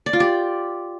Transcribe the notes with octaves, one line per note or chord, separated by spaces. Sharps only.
D5
F4
G4